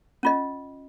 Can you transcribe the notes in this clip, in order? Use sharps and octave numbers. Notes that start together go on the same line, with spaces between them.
C#4 F4 D#5